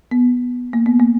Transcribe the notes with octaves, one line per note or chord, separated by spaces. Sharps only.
B3
A#3
B3
A#3